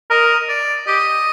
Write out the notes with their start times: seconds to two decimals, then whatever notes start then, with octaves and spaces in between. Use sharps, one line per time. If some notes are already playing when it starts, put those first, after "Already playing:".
0.10 A#4 D#5
0.49 D5
0.87 G4 D#5